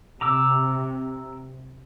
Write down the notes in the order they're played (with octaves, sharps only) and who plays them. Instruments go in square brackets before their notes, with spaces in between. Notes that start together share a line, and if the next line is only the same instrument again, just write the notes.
[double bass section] C3 [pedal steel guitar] A#5 D6 E6